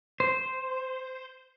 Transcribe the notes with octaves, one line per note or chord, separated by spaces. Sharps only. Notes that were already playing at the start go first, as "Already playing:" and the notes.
C5